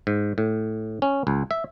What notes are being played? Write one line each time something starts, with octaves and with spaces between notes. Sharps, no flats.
G#2
A2
C#4
C#2
E5